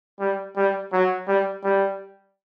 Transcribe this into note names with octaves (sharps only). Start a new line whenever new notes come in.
G3
G3
F#3
G3
G3